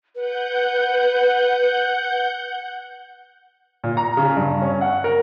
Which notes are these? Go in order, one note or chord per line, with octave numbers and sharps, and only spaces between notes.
B4 F#5 G6
A#2
A#5
C#3
G2
C#4
F#5
A#4